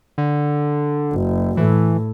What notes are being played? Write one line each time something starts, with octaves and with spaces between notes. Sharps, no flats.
D3
F#1
A2 E3